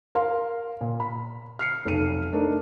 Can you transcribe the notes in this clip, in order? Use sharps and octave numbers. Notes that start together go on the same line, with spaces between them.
A#4 F5 C6
A#2
B5
F6 C7 C#7
F1 B1 A4 F6 D#7
A3 D4 D#4 A#4